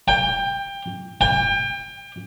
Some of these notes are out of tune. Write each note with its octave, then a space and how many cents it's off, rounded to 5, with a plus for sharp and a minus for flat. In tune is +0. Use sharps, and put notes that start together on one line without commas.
G5 +20
G5 +30